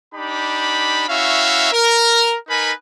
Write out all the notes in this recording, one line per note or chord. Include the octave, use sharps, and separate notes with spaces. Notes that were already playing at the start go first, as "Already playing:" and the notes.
D4 D#4 G4 B5
C#4 E4 F#4 E5 F5
A#4
D#4 A#4 B4 G#5 B5